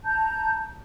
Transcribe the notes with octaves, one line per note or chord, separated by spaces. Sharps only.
A5 A#5 G6